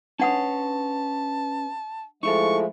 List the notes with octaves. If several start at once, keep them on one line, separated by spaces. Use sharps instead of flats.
C#4 D4 B4 C#5 F#5 A5 D#6
F3 G#3 A3 D#4 E4 A4 C#6